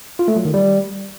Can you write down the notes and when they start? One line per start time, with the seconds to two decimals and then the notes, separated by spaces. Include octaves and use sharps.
0.19 F4
0.28 A3
0.37 F#3
0.45 D#3
0.54 G3